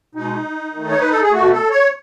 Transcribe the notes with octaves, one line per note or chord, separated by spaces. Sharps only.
B2 G#3 D#4
D#3 A3
C#5
B4
A4
G#4
B2 A3 F#4
A4
C#5